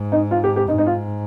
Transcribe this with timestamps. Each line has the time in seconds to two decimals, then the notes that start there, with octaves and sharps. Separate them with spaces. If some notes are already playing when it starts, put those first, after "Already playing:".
Already playing: G#2
0.12 D#4
0.31 F4
0.44 G4
0.56 G4
0.68 G#2 D#4
0.78 D#4
0.86 F4